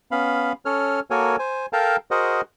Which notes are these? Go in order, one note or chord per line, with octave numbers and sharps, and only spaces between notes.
B3 C#4 F5 B5
C#4 A4 C#5 F6
A#3 F#4 A4 A#4 C#5 G#5
C5 G#5
A4 A#4 F5 G5 A5 A#5
F#4 G#4 A#4 C5 D#5 F#5